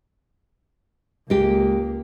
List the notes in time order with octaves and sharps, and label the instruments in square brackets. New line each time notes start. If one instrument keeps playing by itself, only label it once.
[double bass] C#2 A#3 [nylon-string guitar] G#3 G4